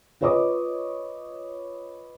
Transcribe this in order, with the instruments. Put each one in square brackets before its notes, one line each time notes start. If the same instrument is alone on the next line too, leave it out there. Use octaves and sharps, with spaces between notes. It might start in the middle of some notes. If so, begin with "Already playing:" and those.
[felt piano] F4 B4 C#5 D#5 D6 D#6